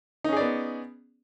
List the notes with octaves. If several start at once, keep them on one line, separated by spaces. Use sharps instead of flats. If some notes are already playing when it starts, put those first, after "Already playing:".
B3 C#4 D#4 G#4 D5